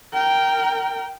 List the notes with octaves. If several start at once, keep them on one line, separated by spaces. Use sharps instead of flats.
A#4 G5